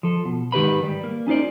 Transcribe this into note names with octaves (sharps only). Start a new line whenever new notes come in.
F3 A4
B2
G#2 D#3 G4 B4 B5
G3
A#3
C#4 D#4 F4 C5 D5